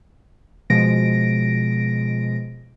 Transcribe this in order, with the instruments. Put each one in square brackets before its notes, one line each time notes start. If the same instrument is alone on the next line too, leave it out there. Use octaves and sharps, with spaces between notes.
[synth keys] B2 F3 G#3 A#6 D7